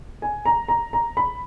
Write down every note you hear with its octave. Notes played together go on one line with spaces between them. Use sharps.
G#5
A#5
A#5
A#5
B5